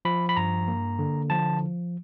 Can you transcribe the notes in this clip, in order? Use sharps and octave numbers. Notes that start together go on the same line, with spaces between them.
F3 B5
B5
G2 A#5
A#3
D3
F3 A5